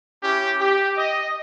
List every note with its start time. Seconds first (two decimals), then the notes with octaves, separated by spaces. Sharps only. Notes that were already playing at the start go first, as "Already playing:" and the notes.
0.22 C#4 E4 G4
0.60 G4
0.98 D#5